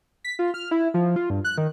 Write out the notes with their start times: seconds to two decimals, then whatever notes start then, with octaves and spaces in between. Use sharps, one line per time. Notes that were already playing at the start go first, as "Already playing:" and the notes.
0.24 B6
0.39 F4
0.54 F6
0.71 E4
0.94 F3
1.16 F4
1.30 G2
1.45 F#6
1.58 D#3